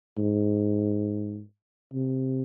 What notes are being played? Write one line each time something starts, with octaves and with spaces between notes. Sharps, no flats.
G#2
C3